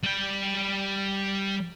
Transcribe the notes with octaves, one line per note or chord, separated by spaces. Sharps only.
G3 G5